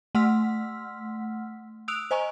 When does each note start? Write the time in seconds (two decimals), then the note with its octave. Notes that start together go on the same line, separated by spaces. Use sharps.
0.15 A3 F#5 C6 E6 F6 B6
1.88 D#6 E6 F#6 D7 F7
2.11 C5 D#5 G#5 A#5 C#6